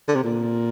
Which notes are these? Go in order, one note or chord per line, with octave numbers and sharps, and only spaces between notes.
D3
C3
A#2